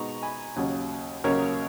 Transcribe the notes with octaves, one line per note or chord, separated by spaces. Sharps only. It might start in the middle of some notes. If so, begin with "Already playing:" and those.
Already playing: B2 G#3 B3 D#4 A#5 C#6
G#5 B5
D#2 C#3 F#3 C#4
D#2 C#3 F#3 C#4 A#4 C#5